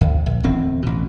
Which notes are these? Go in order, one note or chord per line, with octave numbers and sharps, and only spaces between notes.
D2
A#1
D1 E2 C4
A1 B2